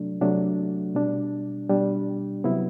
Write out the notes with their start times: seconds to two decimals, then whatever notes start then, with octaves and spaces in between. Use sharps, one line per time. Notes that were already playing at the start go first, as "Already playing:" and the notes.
Already playing: C3 F#3 A3 D4
0.21 C3 F#3 A3 D4
0.95 B2 G3 D4
1.69 B2 G3 D4
2.44 C3 F#3 B3 E4